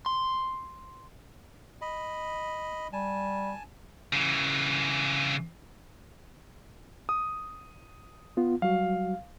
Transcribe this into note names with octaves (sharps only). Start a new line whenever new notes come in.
C6
D#5 B5
G3 G#5 A5
C#3 E3
D#6
B3 F4
F#3 G3 F#4 F5